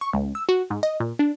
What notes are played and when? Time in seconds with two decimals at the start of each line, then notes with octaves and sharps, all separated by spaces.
0.01 C#6
0.13 C#2
0.35 E6
0.49 F#4
0.70 G#2
0.83 D#5
1.00 A#2
1.19 D4